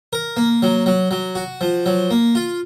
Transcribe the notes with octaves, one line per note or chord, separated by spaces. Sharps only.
A#4
A#3
F#3
F#3
F#3
F#4
F3
F#3
A#3
F4